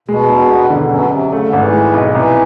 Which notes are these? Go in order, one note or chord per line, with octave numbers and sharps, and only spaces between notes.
B2 G#3
E1
B3
D3
F#2 B2
F#2 C3
C#3 A3
D3
G#1
E3
G#3
B1
C2 E3